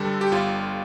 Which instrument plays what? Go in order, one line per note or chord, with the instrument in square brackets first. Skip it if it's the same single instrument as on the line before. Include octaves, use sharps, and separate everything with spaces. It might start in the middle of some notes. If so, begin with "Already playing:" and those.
Already playing: [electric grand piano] G2 D3 G3 A4
G4
G1 F4